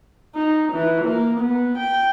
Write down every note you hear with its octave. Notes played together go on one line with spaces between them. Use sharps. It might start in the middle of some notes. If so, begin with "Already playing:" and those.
D#4
E3
A#3
B3
G5